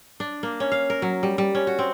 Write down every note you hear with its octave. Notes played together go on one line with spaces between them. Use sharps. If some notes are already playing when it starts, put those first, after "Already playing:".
D4
A#3
C#4
F5
A#4
F#3
G3
G3
C#4
F#4
C4